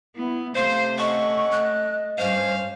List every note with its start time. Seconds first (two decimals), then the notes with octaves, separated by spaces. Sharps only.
0.16 B3 E4
0.56 C3 A3 C5 F5 C6
0.98 C#4 A4 D#5 F#5 C#6
1.51 A3 F#6
2.18 G2 C#4 C5 F5